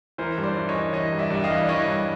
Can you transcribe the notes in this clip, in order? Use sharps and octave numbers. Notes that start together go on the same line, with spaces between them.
E3 A#4 C5
G2
C5 D5
E3
C#5 D#5
E3
E3 C#5 D#5
G2
D5 E5
G2 E5
D#5 F5
E3
D5
E3 C#5 D#5
G2